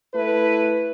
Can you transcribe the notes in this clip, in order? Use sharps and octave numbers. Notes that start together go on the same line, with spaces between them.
A3 E4 B4